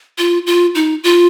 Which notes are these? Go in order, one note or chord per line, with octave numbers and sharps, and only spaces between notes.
F4
F4
D#4
F4